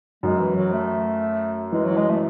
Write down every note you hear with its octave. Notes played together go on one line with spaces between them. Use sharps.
F#2 G#3
E3
F#3
A3
E3 G#3
F#3
G#3
A3